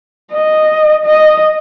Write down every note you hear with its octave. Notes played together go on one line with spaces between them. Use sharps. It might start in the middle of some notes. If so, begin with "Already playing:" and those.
D#5
D#5